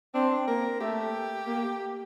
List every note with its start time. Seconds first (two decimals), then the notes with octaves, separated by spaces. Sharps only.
0.14 C4 D4
0.47 A#3 A#4
0.80 A3 G4
1.47 A#3